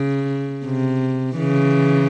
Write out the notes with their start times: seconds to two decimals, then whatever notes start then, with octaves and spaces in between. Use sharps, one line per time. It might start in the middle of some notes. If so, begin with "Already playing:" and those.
Already playing: C#3
0.65 C3
1.38 C#3 E3